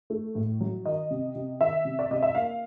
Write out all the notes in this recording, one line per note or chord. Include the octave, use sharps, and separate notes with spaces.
A3
A2
F#3
D#3 D#5
C3
C3
D#3 E5
C3
D5
C3 D#5
E5
A#3 F5